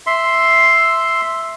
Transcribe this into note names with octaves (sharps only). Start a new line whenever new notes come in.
E5 C6